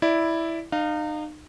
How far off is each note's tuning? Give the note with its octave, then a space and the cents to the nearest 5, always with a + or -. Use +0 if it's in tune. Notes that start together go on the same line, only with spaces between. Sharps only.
E4 +0 D5 +0
D#4 -35 F5 +5